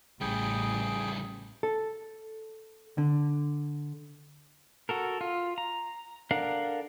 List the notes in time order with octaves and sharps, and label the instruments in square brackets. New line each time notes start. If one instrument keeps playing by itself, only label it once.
[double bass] A1 [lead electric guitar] C#3 G3 [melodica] G#4 G5
[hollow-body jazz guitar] A4
D3
[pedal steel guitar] F#4 A4 A#4
F4
A#5
D4 A4 A#4 F5 F#5